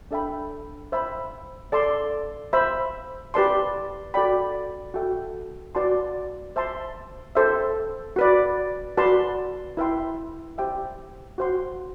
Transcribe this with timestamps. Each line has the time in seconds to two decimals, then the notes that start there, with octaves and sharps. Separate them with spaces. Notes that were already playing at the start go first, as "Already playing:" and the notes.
0.11 D4 A4 E5 G5 B5
0.92 C5 E5 B5
1.72 A4 D5 A5 C6
2.53 C5 E5 B5
3.34 G4 B4 D5 A5 C6
4.14 F#4 A4 D5 G5 B5
4.94 F#4 A4 E5 G5
5.75 F#4 B4 D5 A5 C6
6.56 C5 E5 A5 C6
7.35 A4 C5 E5
8.16 F#4 B4 D5
8.97 F#4 B4 D5 A5 C6
9.77 E4 B4 E5 G5 C6
10.58 G4 C5 E5 G5
11.38 F#4 C5 F#5 C6